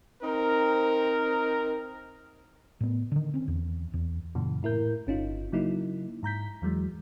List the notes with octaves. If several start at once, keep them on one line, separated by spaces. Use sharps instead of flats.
C4 D#4 A#4
A2 B3
D3 D#3
C4 C#4
E2
E2
F#2 A#2 C#3 E3
A2 E4 A#4 G6
G1 C#4 D#4 F4
C#3 F#3 A#3 D#4 E4
G#2 A#5 G6 B6
E2 E3 F#3 G#3